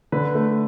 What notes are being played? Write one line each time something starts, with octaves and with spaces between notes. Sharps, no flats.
D3 B4
A3